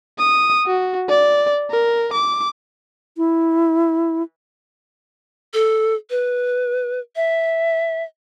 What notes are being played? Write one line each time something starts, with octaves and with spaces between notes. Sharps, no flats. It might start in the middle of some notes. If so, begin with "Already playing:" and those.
D#6
F#4
D5
A#4
D6
E4
A4
B4
E5